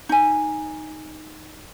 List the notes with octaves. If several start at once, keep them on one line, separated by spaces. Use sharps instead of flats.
D#4 G#5